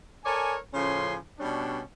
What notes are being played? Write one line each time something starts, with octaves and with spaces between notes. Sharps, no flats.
A4 A#4 C#5 D5 G#5
A2 C#3 F3 C#4 G#5 C6
B2 G3 C#4 D4